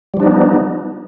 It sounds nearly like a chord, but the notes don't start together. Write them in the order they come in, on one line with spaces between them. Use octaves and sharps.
G3 F3 D4 D#4 B3